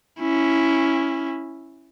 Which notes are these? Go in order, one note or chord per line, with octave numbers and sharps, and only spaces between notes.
C#4 E4